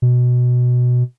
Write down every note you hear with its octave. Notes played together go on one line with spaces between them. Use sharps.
B2